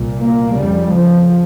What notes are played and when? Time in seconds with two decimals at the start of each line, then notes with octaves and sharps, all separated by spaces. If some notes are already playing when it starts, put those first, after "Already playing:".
Already playing: C2 A#2
0.21 A#3
0.57 F2 C#3 G3
0.94 F3